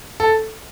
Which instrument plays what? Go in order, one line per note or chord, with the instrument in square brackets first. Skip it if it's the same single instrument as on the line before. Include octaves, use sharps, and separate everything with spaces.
[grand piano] A4